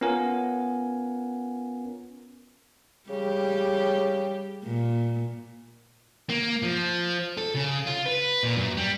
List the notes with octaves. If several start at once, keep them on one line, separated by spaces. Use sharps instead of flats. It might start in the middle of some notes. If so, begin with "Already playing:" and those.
B3 C#4 F4 A#4 F#5 G#5
C#3 G3 G4
A#2
A#3
F3
A4
C#3
F4
B4
A#2
F#2
G3